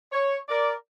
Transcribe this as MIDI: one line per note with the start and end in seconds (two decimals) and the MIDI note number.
0.12 0.37 73
0.49 0.73 70
0.49 0.73 74